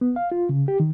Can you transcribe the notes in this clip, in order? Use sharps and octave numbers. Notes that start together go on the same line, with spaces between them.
B3
F5
F4
C#3
G4
D#3